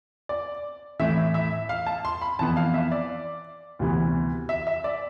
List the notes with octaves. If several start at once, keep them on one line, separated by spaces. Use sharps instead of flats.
D5
A2 E3 A3 E5
E5
F5
A5
C6
B5
F2 E3 B3 A5
F5
E5
D5
D2 C3 E3 B3
E5
E5
D5